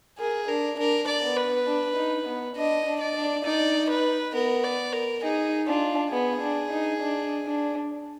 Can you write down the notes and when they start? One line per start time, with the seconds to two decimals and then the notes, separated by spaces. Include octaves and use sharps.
0.18 G#4 A#4
0.48 D4 A#4
0.78 D4 A#4
1.07 D5
1.23 B3
1.37 B4
1.67 D4
1.97 D#4
2.27 B3
2.56 D4 D#5
2.86 D4
3.01 D5
3.16 D4
3.45 D#4 D5
3.89 B4
4.34 B3 A#4
4.64 D5
4.93 A#4
5.23 D#4 G#4
5.67 D4 F4
6.12 B3 G#4
6.42 D4
6.71 D#4
7.01 D4
7.46 D4